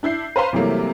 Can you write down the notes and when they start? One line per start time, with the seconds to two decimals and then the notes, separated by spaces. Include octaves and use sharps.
0.03 D4 E4 G6 C7
0.36 B4 C5 F5 A#5 C6
0.53 C3 E3 F#3 G3 A3 A#3